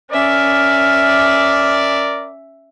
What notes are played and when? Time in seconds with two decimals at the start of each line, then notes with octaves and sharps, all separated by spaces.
0.11 C#4 A#4 D5 E5 F6